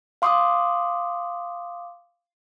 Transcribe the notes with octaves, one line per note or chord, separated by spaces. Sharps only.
F5 C6 D6 D#6